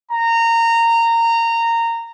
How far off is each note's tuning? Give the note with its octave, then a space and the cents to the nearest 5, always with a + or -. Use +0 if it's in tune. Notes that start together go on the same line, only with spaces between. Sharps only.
A#5 -20